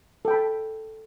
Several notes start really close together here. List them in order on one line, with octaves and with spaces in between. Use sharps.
A4 G5 B5 A5